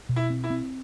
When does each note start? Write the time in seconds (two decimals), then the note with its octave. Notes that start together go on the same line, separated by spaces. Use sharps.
0.09 B2
0.16 E4
0.30 C4
0.44 E4
0.50 C4